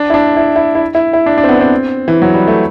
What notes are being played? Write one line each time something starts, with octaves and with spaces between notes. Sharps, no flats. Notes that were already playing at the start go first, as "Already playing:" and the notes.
Already playing: D4
E4
D4
E4
E4
E4
E4
E4
D4
D4
C4
B3
C4
E3
F#3
G3
A3